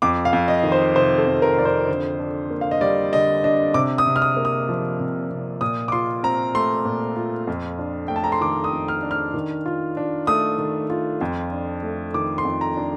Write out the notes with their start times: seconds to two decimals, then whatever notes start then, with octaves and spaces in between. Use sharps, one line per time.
0.02 F2 D6
0.25 F5
0.33 F2
0.48 D#5
0.64 D#3
0.72 C5
0.95 C3 C5
1.18 A4
1.27 F2
1.42 A#4
1.58 F2 D5
1.65 C5
1.88 D3
2.19 D4
2.50 A#3
2.61 F5
2.71 D#5
2.81 G3 D5
3.13 D3 D#5
3.44 D4 D#5
3.74 C3 D6
3.98 D#6
4.06 C3
4.16 F6
4.22 D#6
4.37 A#3
4.45 D#6
4.69 F3
5.00 C3
5.31 C3
5.61 A#2 D#6
5.88 D6
5.92 F4 C6
6.23 C4 A#5
6.54 A3 C6
6.85 A#2
7.16 F4
7.47 F2
7.79 D4
8.08 A3 G5
8.16 A5
8.24 A#5
8.32 C6
8.41 D#3 D6
8.64 D#6
8.73 F2
8.88 F6
9.03 D4
9.11 F6
9.34 D#3
9.66 F4
9.97 D4
10.27 A3 D#6
10.58 D#3
10.90 F4
11.21 F2
11.52 D4
11.83 A3
12.14 D#3 D6
12.38 C6
12.45 F2
12.61 A#5
12.77 D4